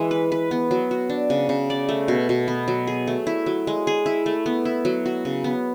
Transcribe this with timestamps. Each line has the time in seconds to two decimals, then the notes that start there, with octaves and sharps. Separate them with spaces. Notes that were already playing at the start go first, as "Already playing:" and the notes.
Already playing: E3 G#3
0.11 B4
0.32 B4
0.51 B3
0.71 F#3
0.91 F#4
1.09 D4
1.30 C#3
1.49 C#3
1.70 D5
1.89 A3
2.08 B2
2.29 B2
2.48 B3
2.68 F#3
2.87 G#4
3.07 A3
3.27 E4
3.46 F#3
3.67 G#3
3.87 G#4
4.06 E4
4.26 A3
4.46 B3
4.65 E4
4.85 F#3
5.06 F#4
5.25 C#3
5.44 B3